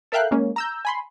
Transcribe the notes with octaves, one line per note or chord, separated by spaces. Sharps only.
A4 A#4 E5 F5 G5 F#6
G#3 A#3 C#4
A#5 E6 G6
G#5 B5 C6